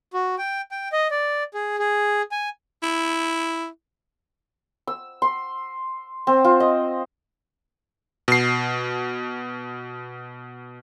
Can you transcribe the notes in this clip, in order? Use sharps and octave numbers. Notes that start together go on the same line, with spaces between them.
F#4
G5
G5
D#5
D5
G#4
G#4
G#5
E4
E6
C6
C4
F4
D#5
B2 C7